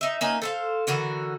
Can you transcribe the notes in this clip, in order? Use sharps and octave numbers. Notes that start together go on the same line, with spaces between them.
D#4 E5
A#3 C#4 D#4 G#5
A4 C5 F5
D3 E3 F#4 A#4